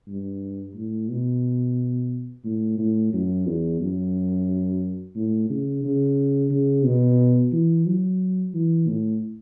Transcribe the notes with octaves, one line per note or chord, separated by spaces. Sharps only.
G2
A2
B2
A2
A2
F#2
E2
F#2
A2
C#3
C#3
C#3
B2
E3
F#3
E3
A2